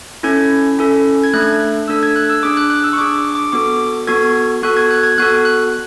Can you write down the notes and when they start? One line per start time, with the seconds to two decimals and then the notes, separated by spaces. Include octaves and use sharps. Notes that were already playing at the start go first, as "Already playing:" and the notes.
0.23 C#4 E4 A4 G#6
0.79 C#4 E4 A4
1.24 G#6
1.34 A3 D4 A4 F#6
1.88 A3 D4 A4 E6
2.03 G#6
2.16 F#6
2.29 E6
2.43 D4 G#4 D6
2.57 F#6
2.70 F#6
2.84 E6
2.93 C#6
2.98 D4 G#4 D6
3.35 D6
3.52 B3 F#4 A4 D6
4.07 B3 F#4 A4 G#6
4.63 B3 F#4 A4 F#6
4.77 G#6
4.91 F#6
5.03 G#6
5.18 B3 F#4 A4 F#6
5.45 F#6